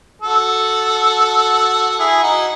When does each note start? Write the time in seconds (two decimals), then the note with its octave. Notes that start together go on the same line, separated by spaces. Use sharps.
0.22 F#4 A4
1.89 F#4
1.99 E4 G#4
2.23 D#4 F#4